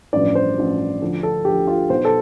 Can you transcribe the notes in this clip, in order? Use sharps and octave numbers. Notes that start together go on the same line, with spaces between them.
A1 G2 F3 D5
C5
A1 G2 F3
D2 D3 F3
A4
D2 D3 F3 G4
F4
B1 B2 C5
A4